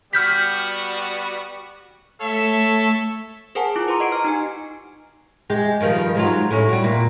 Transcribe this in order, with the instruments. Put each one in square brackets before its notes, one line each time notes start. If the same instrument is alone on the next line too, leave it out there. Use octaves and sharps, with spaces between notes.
[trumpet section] G3 B3 F#4 [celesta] F6 G6 B6
[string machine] A3 [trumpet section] A4 C#5 E5
[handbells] G#4 A#4 C5 F#5 G#5 A5
E4 F4 D6
B4 A#5 C6 D6
D#5 F#5 C#6 C7 D7
A#5 F6
D#4 G4 G#5
[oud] G#3 G4
G2 D#3 F3
G#2 F#3 F4
A2 C#4
G3 F#4
A#2